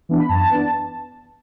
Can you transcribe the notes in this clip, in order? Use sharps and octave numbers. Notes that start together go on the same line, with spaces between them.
E3 B3 D4
B5
F#2 A5
E3 B3 D4